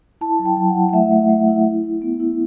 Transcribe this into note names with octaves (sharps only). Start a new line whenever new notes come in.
E4 A5
F#3
G5
F#3
F#5
E4
F#5
A3 E5
A3
A3
E4
E4
E4
B3
E4